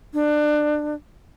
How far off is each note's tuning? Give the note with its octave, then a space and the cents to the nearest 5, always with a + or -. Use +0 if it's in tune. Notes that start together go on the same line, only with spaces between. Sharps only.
D4 +25